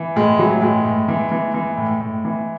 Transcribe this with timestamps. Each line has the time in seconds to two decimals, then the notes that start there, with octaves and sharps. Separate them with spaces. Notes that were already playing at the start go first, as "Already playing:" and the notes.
Already playing: E3
0.16 A2 G#3
0.39 E3 F#3
0.62 A2 G#3
0.85 A2
1.08 E3
1.32 E3
1.54 E3
1.77 A2
2.00 A2
2.25 E3